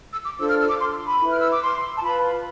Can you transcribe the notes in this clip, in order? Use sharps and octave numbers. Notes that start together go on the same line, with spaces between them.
E6
D6
D4 F4 A4 C5 E6
F6
E6
D6
C6
B5
E4 B4
F6
E6
D6
C6
A5
F4 B4 B5